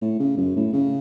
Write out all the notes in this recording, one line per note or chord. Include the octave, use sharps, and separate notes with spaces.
A2
C#3
F#2
A2
C#3